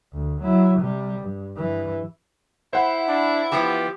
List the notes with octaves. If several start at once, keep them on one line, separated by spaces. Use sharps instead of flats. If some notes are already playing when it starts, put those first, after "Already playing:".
D2
F#3 E4
C3 G3
G2
G2 E3
E4 C5 F#5 B5
D4
E3 F3 B3 G4